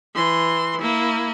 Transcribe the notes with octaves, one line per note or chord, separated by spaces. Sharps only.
E3 C6
A#3 E4